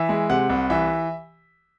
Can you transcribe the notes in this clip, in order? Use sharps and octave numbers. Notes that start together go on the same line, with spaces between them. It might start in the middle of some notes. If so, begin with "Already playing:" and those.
Already playing: E3 E5
G#3
C3 F#5
C2
E3 E5